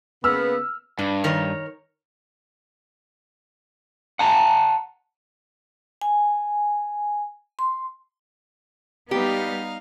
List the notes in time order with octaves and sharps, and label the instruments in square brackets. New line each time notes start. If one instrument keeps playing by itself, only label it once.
[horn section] C#3 A#3 B3 [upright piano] E6 F6
[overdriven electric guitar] G2 [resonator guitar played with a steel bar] D4
[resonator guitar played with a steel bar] D#3 A#4 C#5
[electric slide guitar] F#5 A5 A#5
[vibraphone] G#5
C6
[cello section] G3 B3 [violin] D#4 F5 [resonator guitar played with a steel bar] G4